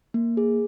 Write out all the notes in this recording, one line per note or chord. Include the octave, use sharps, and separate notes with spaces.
A#3
G#4